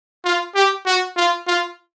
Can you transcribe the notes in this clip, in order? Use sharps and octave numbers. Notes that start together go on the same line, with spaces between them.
F4
G4
F#4
F4
F4